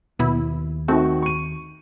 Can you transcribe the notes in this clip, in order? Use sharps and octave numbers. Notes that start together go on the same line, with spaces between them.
D#2 B2 B3 E4
D#3 A3 C4 F#4
C#6 D#7